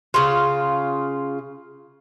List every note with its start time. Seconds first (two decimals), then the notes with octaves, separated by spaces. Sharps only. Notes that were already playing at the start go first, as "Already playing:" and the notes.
0.14 C#3 F4